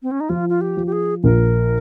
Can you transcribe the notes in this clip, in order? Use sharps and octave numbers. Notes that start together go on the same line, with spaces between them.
C4
C#4
D#4
F3 F4
F4
G4
F3
G4
G#4
A#1 A#4